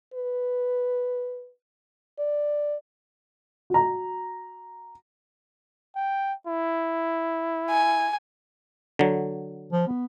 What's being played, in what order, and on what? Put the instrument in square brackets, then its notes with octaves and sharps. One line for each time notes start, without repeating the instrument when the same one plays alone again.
[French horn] B4
D5
[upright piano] F#4 A#5
[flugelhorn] G5
E4
[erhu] G#5
[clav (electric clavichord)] D3 F#3
[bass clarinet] F3
B3